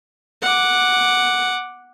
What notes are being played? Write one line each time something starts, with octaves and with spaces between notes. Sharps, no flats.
F#5 D6